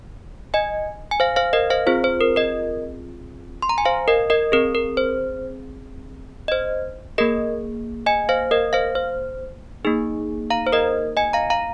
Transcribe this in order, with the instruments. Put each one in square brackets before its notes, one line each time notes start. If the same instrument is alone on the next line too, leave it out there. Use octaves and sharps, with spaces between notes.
[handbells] D#5 G#5
G#5
C5 F5
C5 F5
A#4 D#5
C5 F5
C4 F4 G#4 C5
C5
A#4
A#4 D#5
C6
A#5
G#5
C5 F5
A#4 D#5
A#4 D#5
C4 G#4 A#4
A#4
C5
D#5
C5
A#3 G#4 A#4 D#5
D#5 G#5
C5 F5
A#4 D#5
C5 F5
C5
A#3 D#4 G#4
F5 A#5
C5
A#4 D#5
D#5 G#5
F5 A#5
F5 A#5